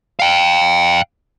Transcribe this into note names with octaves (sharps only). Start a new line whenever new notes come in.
F5 G5